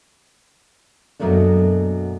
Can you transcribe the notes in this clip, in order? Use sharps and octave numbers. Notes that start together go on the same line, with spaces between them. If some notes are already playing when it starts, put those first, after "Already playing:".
F#2 B2 F#3 A3 A#3 D4